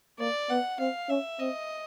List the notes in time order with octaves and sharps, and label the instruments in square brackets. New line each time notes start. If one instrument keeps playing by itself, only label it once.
[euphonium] A#3 [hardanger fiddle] D5
[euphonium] B3 [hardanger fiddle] F#5
[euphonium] C4 [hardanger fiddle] F5
[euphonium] C#4 [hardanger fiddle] E5
[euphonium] C4 [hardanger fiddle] D#5